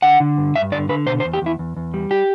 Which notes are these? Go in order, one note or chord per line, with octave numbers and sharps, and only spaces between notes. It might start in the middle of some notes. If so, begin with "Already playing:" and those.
D3 F#5
D3
G2
G2 E5
D3 D5
D3 B4
B2 C5
C5
E2
G4
E2 E4
E2
E2
G3
G4